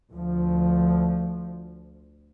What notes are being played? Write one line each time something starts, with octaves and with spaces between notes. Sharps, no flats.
D2 F3